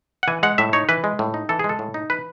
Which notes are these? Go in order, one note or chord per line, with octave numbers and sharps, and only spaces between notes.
F#5
E3 G#5
G#3 F#5
A2 E5
D#4 C#5
E3 B4
G#3
A2
D#4
E3 A4
G#3 G#4
A4
A2
D#4
E3 B4